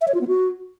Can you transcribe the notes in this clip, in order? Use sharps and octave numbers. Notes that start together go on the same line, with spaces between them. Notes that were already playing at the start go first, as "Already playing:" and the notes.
E5
C#5
F4
B3
F#4